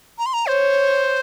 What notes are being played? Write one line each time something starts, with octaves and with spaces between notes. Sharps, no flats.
A#5
C6
A#5
C5 C#5